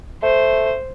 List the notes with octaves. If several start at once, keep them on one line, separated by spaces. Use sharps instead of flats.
A3 C5